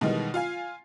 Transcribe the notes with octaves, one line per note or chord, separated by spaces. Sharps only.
B2 D#3 E3 G3 G#3 B3
F4 F5 G#5